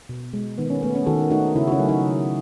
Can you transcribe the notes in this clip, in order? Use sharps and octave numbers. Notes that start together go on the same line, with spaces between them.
B2
G#3
D#3 B3
C#4
A3 B3
C#4
D#3 F#4 A4
A3 D#4 F#4
C#3 C#4 E4
F#4
C#4 E4
F#3 A3
D#4 F#4
C#3